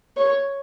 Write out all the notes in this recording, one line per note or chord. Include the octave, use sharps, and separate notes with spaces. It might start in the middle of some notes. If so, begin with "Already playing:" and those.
C#5